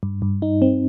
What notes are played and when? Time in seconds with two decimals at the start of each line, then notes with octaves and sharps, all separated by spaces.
0.03 G2
0.22 G2
0.42 D#4
0.62 C4